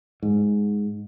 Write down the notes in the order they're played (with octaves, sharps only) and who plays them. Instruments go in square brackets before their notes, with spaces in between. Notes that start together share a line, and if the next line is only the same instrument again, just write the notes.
[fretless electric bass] G#2